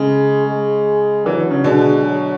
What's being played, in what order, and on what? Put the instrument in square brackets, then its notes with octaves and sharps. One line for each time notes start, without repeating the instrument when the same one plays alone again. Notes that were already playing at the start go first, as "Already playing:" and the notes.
Already playing: [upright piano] C#3 [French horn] G#3
[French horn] G#3
[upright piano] E3 [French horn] F#3
[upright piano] D3
C#3
[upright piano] B2 D3 [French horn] G#3
[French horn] F#3